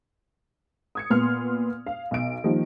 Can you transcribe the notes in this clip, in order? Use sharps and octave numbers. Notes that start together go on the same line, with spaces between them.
D#6 G#6 C#7
A#2 B3 C6 F6
F5
B1 D7
D#3 F3 G3 A#3